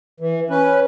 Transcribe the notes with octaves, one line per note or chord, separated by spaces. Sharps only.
E3
C#4 B4